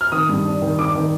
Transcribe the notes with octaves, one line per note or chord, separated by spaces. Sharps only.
F6
D#3 D#6
G2
D4
D#3
D4 D6
D#3